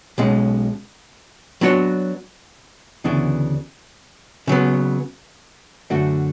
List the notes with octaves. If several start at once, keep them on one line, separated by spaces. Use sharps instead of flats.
B1 B2 G#3 C#4
F#3 B3 D4 F#4 C#5
D2 C#3 E3 B3 D4
C#3 F#3 B3
F#2 D3 A3 D4 F#4